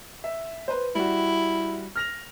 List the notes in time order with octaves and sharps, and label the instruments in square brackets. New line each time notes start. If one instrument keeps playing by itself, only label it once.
[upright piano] E5
B4 C5
[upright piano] G3 F#4 [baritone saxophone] E4
[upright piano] F6 A#6 F7